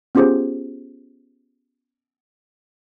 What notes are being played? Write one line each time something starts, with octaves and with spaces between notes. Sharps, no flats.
B3 C#4 F4 G4 G#4 C5